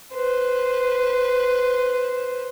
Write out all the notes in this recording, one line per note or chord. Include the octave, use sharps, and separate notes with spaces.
B4 C5